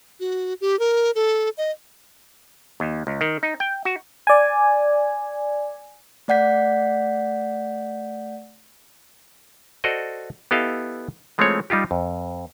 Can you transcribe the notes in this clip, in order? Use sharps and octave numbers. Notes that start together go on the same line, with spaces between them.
F#4
G4
A#4
A4
D#5
D#2
C#2
D#3
D#4
G5
F#4
D5 G#5
A3 D5 F#5 G6 B6
F#4 A4 C5 D5 D#5
B3 E4 G4 A4 D#5 F5
E3 G#3 A3 C4 F4 C#5
G3 D#4 F4 G4
F2